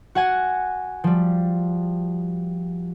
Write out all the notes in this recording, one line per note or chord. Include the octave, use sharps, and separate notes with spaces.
F#4 F#5 G#5
F3 G3